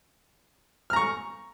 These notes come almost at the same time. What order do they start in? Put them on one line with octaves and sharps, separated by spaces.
F6 A#5 C#6